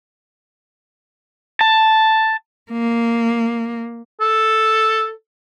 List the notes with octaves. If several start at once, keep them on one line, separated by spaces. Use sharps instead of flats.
A5
A#3
A4